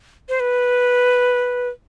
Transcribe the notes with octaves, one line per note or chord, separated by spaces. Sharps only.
C5
B4